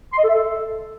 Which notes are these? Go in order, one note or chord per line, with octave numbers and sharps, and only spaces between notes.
C6
D#5
A4
E5
A4